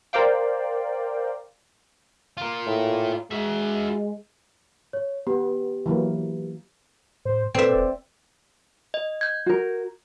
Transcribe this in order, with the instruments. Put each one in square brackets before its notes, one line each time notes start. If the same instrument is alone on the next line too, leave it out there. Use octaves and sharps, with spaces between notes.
[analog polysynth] A#4 C5 D5 F5 G5
[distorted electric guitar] F4 A#4
[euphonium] A2
[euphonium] G#3 [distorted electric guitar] F#4 E5
[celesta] C#5
[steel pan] B3 [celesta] G4
[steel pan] E3 F#3 A#3
[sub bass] A2 [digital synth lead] C5
[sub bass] A#2 [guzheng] C4 E5 [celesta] A4 B4 [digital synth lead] D5
[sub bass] E1
[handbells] D#5
G6 G#6
[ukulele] F#4 A#4